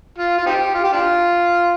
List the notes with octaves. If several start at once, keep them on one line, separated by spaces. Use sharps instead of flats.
F4
F4
C4 D#4 G4
F4
G4
D4 F4